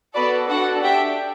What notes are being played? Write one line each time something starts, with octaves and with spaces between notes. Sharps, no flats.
B3 F#4 A4 B4 D5
D4 F#4 A4 D5 F#5
D4 G4 E5 G5